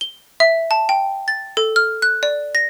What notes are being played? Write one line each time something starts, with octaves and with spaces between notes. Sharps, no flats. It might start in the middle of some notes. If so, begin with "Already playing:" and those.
G7
E5
A5
G5
A6
A4
F6
F#6
D5
A#6